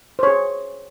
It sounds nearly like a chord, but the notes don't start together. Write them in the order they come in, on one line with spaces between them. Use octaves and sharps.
C5 C#5 G#4